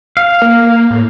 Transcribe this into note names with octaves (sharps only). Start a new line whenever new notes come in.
F5
A#3
A2